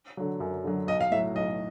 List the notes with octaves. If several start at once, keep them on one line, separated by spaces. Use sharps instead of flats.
D3 F#3
F#2
D3 F#3
B1 D#5
F5
A2 F#3 E5
B1 D#5